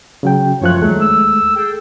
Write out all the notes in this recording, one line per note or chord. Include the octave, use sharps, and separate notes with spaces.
C#3 F#3 G5
F#2 F3 A3 F4 C#5 F#6
D#2 F#3 G#3 A3
E6
G#4 A4 G5